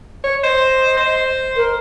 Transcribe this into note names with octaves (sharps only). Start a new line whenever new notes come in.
C#5
C5 D#5
C5
A#4